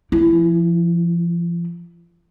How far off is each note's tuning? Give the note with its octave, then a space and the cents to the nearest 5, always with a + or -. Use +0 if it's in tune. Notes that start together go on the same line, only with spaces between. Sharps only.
F3 -35 E4 +15